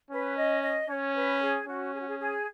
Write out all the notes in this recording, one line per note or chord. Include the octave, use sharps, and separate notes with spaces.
C#4 B4
D#5
D#5
C#4 C#5
B4
G#4
C#4 F#4
G#4
F#4
G#4
G#4